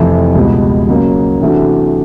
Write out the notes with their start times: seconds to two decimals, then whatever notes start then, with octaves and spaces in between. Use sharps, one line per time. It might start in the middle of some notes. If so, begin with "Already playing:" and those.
Already playing: F2 C3 E3 A3
0.35 C#2 B2 G3
0.89 C#3 F#3 A#3
1.41 C3 E3 A3 D4 F#4